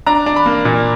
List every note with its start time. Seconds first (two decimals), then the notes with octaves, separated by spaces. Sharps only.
0.06 D4 A#5
0.26 D4
0.36 B5
0.46 A#3
0.65 A#2